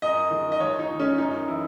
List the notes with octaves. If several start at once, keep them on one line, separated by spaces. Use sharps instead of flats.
F#2 D#5
D#3
D#5
D#2 C#5
D#4
D#3
C#4
F#2 D#4
E3 E4